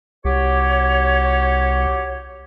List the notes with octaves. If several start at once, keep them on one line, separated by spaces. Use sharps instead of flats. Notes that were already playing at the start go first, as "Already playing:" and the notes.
C2 F#4 G4 C#5